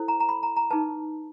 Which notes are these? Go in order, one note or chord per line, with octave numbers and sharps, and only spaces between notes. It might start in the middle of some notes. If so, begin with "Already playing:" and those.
Already playing: E4 A4 C5
A#5
A#5
B5
A#5
A#5
D#4 G#4 B4 A5